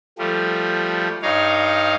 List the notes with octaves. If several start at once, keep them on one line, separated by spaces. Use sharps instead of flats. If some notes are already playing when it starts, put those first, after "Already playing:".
F3 G3 A3
G2 D#4 C#5 F5